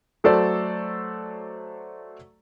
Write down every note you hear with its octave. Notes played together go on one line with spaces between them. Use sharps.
F#3 A3 F#4 A4 C5 D5